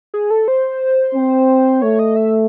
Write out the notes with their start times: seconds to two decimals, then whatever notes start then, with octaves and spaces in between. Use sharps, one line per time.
0.14 G#4
0.30 A4
0.48 C5
1.15 C4
1.82 A3 C#5
1.99 D#5
2.16 E5